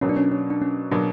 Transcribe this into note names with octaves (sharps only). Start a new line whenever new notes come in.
B2 F#3 A#3 C#4
D4
C#4
C#4
D4
C#4
B2 F#3 A#3 D4